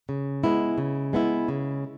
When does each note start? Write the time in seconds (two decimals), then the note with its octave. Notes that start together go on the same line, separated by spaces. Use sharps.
0.09 C#3
0.44 G#3 B3 E4
0.78 C#3
1.13 G#3 B3 E4
1.48 C#3